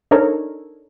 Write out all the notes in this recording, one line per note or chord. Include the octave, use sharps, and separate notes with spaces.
D4 D#4 A4 A#4 C#5